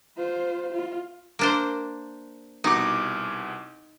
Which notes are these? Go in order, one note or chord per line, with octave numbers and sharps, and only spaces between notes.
F4 C5
F4
A#3 D4 C5
C2 B2 D#4 D6